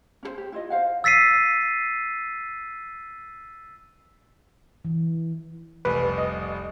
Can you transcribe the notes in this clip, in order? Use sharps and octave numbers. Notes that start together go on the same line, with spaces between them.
C#4 G#4 C5
G4
E4 F4 D#5
C5 F5 F#5
E6 A6 B6 C7 D#7
E3
F1 C2 B4
D#5